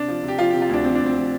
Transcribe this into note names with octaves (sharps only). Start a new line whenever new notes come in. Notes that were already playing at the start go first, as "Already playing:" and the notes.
Already playing: C3 D4
F3
C3
G4
F3 F4
C3 G4
F4
D2 D4
F3 C4
D2 D4
C4
F3